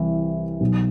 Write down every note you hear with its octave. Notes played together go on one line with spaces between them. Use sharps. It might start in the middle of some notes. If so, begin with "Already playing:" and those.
Already playing: C2 C3 E3
B1 B2